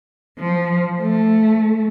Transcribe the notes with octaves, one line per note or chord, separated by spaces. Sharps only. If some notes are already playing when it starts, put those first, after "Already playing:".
F3
A3